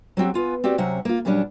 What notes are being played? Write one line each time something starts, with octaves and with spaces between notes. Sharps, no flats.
F#3 G3 C4 F#4 G4
B3 F4 G#5
C4 F#4 G4 D5
C3 F#3 C#4 E5 F#5
A#3 F4
A#2 F#3 G3 C#4 D4